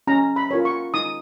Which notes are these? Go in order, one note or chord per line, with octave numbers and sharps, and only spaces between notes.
C#4 A#5
B5
F4 A#4 C#5
C#6
D#4 D#6